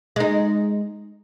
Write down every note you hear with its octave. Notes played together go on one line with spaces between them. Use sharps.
G#3 D#4